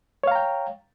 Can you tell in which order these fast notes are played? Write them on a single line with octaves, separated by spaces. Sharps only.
C#5 F5 A#5 G5